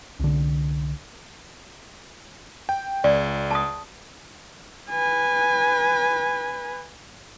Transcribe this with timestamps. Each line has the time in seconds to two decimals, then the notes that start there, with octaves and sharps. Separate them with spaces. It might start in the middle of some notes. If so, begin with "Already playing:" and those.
0.20 C2 D3
2.69 G5
3.04 C#2 D5
3.51 A5 D#6
4.90 B4 G#5